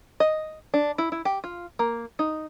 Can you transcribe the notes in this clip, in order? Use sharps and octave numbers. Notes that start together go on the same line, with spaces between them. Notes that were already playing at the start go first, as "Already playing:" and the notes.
D#5
D4
E4
E4
G4
F4
A#3
D#4